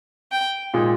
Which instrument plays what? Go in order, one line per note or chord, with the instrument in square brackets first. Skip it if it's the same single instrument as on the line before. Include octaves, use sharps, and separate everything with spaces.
[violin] G5
[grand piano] A#2 G#3 D#4